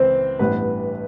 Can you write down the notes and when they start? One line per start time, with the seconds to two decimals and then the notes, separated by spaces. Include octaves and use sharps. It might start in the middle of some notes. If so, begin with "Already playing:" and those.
Already playing: C#2 E3 C4 C5
0.39 A1 G2 E3 B3 B4